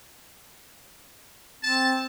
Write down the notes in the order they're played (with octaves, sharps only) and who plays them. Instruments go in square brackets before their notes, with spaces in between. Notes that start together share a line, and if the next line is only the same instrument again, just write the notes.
[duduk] C4 [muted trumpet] A5